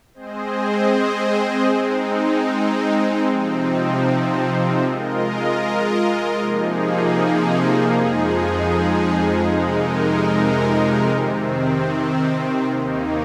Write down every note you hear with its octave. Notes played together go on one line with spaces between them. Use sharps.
G#3 C4 G#4 C5 D#5
G#3 C4 D#4
C3 F3 C4 D#4
G#3 F4 A#4 D#5
C3 F3 A#3 D#4 G#4
F2 F3 G#3 D#4 G#4
F2 C3 G#3 D#4 A#4
C3 D#3 C4
D#2 D#3 A#3 D#4